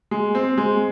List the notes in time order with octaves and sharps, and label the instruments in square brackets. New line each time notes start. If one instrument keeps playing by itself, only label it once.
[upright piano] G#3
C4
G#3